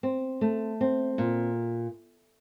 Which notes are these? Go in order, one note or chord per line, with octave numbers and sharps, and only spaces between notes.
C4
A3
C4
A#2